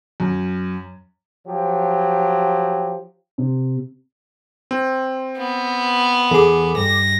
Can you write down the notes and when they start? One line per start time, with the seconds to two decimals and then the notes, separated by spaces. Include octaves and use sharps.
0.20 F#2
1.47 F3 F#3 G4
3.38 C3
4.71 C4
5.38 B3
6.31 E2 G#4 A4 D6
6.77 G2 A#6